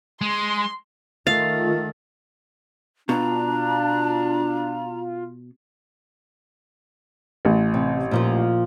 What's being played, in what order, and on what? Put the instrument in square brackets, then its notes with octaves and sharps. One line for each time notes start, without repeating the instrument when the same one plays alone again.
[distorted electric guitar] G#3 [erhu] C6
[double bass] D#3 A3 [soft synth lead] F4 [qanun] F5 [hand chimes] A6
[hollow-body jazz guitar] B2 [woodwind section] D4 [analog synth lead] F4 [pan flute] A#5
[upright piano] A1
[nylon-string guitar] C3
A#2 F3 F4